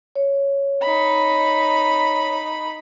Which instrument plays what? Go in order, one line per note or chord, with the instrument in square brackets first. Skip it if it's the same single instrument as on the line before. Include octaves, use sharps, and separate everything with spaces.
[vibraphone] C#5
[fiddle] D#4 B5